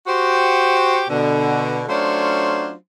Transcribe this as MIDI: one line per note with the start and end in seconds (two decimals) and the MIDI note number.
0.07 1.05 66
0.07 1.05 67
0.07 1.05 72
1.09 1.83 47
1.09 1.83 50
1.88 2.73 54
1.88 2.73 57
1.88 2.73 61
1.88 2.73 62
1.88 2.73 65
1.88 2.73 72